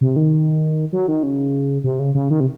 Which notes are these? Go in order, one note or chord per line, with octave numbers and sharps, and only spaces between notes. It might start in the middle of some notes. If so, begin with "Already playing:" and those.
C3
D#3
F#3
D#3
C#3
C3
C#3
C#3
D#3
C3